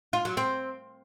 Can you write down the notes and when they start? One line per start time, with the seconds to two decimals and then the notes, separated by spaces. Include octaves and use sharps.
0.13 F4
0.25 F#3
0.37 C4